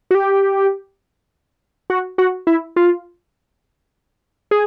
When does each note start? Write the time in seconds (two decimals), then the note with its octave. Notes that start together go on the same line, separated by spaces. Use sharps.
0.11 F#4
0.15 G4
1.90 F#4
2.18 F#4
2.47 E4
2.76 F4
4.51 G#4